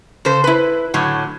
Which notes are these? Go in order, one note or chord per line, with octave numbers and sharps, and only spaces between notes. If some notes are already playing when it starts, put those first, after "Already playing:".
C#3 A4 C5
E4 B4
A2 D3 F#3